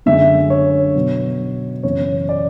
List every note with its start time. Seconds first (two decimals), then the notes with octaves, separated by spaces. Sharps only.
0.06 F#2 D3 G#3 E5
0.50 C#5
0.95 B2 F#3 B3
1.83 F#2 C#3 E3 B3 C#5
2.29 D5